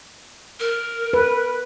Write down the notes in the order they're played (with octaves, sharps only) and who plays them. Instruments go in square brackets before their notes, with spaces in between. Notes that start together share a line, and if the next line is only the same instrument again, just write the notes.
[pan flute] A#4
[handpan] B4